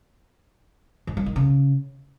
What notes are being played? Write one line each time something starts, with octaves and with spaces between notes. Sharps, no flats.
D#3
F#3
D#3
C#3